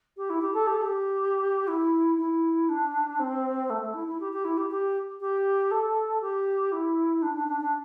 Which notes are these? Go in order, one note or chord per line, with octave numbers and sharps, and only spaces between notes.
G4
E4
G4
A4
G4
A4
G4
E4
E4
D4
C4
A3
A3
E4
E4
G4
G4
E4
G4
G4
G4
A4
G4
E4
D4
D4
D4
D4